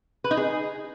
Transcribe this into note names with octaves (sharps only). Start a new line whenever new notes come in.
B4
D#4
G#4